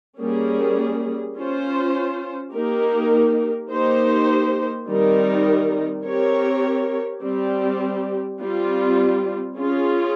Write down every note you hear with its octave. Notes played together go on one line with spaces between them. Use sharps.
G3 A#3 C#4 G#4
C#4 F4 C5
A#3 D#4 G4 A#4
A#3 D#4 G4 C5
D#3 G3 C4 D#4 A#4
C4 G4 A#4 C#5
G3 C4 G4
G3 C4 F4
C#4 F4 G#4